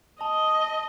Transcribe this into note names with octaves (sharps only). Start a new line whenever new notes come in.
D#5 A5